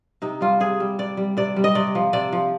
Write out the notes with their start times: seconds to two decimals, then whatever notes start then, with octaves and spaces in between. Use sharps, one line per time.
0.22 C3 D#4
0.41 G3 F4
0.60 C3 G#4
0.80 G3
0.99 C3 D5
1.17 G3
1.37 C3 D5
1.56 G3
1.64 D#5
1.75 C3 D5
1.95 F3
2.13 C3 D5
2.33 F3